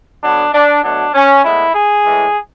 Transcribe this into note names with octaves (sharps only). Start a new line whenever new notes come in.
D3 F#3 B3 D4
D4
B2 F#3 A3 D4
C#4
A2 G#3 B3 E4
G#4
A2 E3 G#3